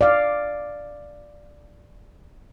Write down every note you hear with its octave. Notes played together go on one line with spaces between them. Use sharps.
D5 F5